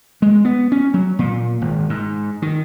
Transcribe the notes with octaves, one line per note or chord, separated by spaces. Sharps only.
G#3
B3
C#4
F#3
A#2
G#1
G#2
D#3